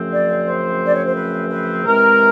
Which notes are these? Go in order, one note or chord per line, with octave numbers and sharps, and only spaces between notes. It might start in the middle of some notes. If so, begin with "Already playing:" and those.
Already playing: F#2 C#3 F3 A3 C4
D5
C5
D5
C#5
C5
B4
B4
C3 E3 G#3 C4 A#4